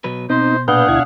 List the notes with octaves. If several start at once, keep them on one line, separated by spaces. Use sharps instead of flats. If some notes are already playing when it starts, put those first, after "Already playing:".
B2 F#3 B4
B2 C4 D#4 C5
A#2 D4 G#4 B4 F5 F#5 G6
D2 E4 G#6